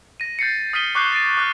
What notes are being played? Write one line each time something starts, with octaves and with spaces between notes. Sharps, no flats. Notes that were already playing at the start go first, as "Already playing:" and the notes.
A#6 D#7
G6 A6 C7 C#7
D#6 F6 A#6 B6 D#7 G7
C#6 D6 F#6 G6 C7 G7
A6 C7 D7 D#7
D6 F6 F#6